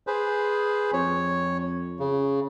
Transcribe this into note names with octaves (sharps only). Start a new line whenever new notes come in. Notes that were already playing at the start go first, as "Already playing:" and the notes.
G#4 B4 C5
F2 C#5
C#3